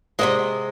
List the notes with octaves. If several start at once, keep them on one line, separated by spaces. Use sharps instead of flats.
C3 F3 G#3 D#5